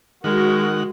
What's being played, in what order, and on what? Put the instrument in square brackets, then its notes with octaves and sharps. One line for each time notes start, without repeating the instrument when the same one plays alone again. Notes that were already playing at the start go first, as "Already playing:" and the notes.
[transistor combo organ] D#3 F#5 [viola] G#3 [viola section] F#4 [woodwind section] A#4